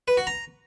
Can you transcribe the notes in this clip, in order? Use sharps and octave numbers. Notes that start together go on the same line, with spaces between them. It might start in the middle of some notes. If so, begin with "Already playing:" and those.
B4
F#4
A#5